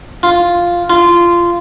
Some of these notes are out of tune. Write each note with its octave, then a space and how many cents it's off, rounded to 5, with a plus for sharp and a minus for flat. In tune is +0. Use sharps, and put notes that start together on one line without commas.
F4 +0
F4 -15